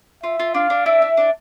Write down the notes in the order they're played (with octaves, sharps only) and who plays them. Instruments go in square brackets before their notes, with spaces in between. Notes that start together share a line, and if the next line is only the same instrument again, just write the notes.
[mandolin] F4 [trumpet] E5
[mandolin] F4
[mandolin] D4 [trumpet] F5
[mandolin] D4
[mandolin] E4 [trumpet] E5
[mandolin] E4
D4